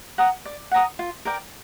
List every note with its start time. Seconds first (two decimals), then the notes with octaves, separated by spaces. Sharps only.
0.18 F#5 A#5 D#6
0.45 D5
0.71 F#5 A#5 D#6
0.99 F4
1.25 A#4 D5 G5